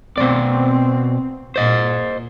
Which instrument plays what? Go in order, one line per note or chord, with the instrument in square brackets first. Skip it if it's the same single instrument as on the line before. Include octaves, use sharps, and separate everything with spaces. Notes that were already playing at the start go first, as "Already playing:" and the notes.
[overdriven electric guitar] B2 D5 [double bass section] C4
[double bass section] A#2 [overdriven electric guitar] C5 D#5